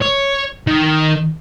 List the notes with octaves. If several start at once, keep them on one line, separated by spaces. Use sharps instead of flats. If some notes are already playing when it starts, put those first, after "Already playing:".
C#5
D#3